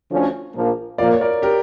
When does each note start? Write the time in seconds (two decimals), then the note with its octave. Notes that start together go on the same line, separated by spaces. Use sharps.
0.11 D2 D3 F3 C#4
0.55 A#1 A#2 F3 A#3
0.98 A#2 F3 A#3 D5 F5
1.12 C#5
1.21 A#4 D5
1.42 G4 A#4